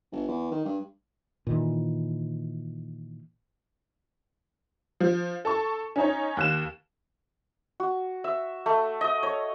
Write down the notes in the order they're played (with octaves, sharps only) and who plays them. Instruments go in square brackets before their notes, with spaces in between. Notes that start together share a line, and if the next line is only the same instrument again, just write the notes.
[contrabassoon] G1
E2
D#3
G2
[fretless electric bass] A#2 D#3 E3
[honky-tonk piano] F3
A4 A5 C#6
C#4 D#4 C#5
D#2 F#6 E7
[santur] F#4
E5
A3
D#5
C#5